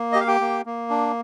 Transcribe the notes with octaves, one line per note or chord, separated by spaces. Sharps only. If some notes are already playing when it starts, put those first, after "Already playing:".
Already playing: A#3
G4 D#5
F5
G4 G5
A#3
A#3
D4